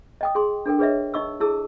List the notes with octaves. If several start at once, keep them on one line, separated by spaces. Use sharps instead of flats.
D#5 G5 D#6
G#4 C6
D4 A4 A#4 G5
G#4 B4 C#5 D#5 E5
D#4 D#5 C#6 E6
E4 G#4 A4 A5 E6